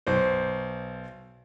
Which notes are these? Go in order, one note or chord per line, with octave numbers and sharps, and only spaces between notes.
B1 C5